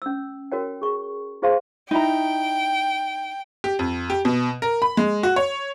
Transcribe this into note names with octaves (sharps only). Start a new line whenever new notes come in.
C#4 E6
F#4 A#4 C#5 G5
G#4 C#6
F4 G#4 C5 F5 A5 C6
D#4 E4 G5 A#5
G4
F2
G4
B2
A#4
B5
G#3
F#4
C#5